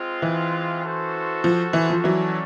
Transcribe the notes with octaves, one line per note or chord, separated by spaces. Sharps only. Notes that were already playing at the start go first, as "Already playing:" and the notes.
Already playing: G#3 C4 F4
E3
C#4 F#4 A4 C5
F3
E3
F3
E3 F#3 A3 C#4 F#4 A4 D5